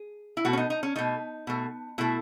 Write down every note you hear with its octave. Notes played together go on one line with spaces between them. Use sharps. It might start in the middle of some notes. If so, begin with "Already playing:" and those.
Already playing: G#4
E4
B2 A3 F#4
C#4
D#4
D#4
C#4
B2 A3 D#4
B2 A3
B2 A3 E4